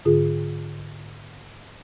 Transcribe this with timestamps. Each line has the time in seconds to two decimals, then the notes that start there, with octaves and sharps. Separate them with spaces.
0.05 G#2 D3 F4 G#4